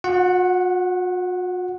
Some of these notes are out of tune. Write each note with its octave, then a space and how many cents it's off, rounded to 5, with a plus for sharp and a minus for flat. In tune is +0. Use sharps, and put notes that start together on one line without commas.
F#4 -45 F#5 +0